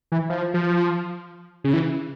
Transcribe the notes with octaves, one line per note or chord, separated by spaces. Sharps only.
E3
F3
F3
C#3
E3